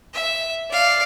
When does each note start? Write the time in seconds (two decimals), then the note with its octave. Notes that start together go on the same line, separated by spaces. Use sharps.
0.14 E5
0.71 D5 F5